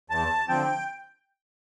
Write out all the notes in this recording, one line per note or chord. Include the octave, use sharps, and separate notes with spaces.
E2 A5
D3 F3 C4 G5